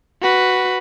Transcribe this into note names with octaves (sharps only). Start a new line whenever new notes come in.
F#4 B4